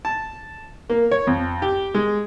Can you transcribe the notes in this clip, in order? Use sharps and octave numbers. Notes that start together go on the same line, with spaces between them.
A5
A#3
C#5
F2
G4
G#3